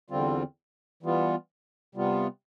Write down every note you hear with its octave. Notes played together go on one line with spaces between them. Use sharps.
E2 D3 G3 C4 F4
E3 G3 B3 F4
C3 G3 B3 F4